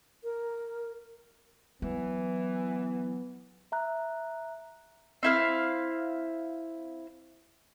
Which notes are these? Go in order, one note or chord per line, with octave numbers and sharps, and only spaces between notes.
A#4
E3 F#3 B3
E5 A#5 F#6
C4 E4 F5